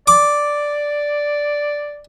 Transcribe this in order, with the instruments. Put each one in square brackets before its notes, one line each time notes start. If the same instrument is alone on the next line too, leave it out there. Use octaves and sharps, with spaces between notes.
[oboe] D5 [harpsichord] D6